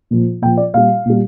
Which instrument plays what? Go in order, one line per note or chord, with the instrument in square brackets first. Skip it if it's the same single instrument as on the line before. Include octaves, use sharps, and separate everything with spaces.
[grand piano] A#2 F3
A#2 G5
F3
D5
A#2 G3 F5
A#2 G3